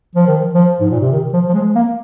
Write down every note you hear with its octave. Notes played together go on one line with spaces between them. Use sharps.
F3
D#3
F3
G#2
A#2
C3
D#3
F3
F3
G#3
A#3